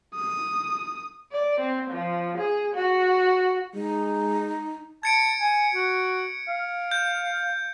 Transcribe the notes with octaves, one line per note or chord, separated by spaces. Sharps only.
D#6
D5
C4
F3
G#4
F#4
G#3 D#4
A5 G#6 C#7 D7
G#5
F#4
F5
G6